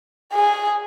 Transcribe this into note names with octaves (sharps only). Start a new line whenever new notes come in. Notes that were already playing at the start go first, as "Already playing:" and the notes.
G#4